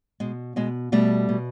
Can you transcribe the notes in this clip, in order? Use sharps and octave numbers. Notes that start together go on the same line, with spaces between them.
B2 G#3
B2 G#3
B2 G3 A3
B2